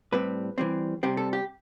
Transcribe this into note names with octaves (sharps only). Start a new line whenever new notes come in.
A2 G3 C4 B4
E3 G3 C4
C3 G3 C4 G4
A4
G4